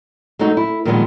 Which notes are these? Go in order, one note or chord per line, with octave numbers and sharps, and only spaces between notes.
F#3 G#3 A3 D#4 F#4
E4
A#2 D#3 F3 G3 G#3 B3